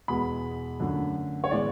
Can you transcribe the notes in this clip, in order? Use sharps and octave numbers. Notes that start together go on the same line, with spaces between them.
E2 B2 G#3 B3 B5
F#2 D3 A3
C#5
A2 E3 G#3 B3 D5